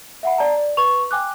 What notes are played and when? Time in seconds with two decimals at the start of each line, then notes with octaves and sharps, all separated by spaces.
0.23 E5 F#5 B5
0.38 D5 A5 A#5
0.57 D5
0.77 B4 C6 C#6 F7
1.11 G5 G#5 D6 F#6